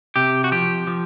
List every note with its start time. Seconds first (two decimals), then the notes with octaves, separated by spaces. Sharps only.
0.16 C3 G4
0.44 F#4
0.52 F3 G4
0.87 F3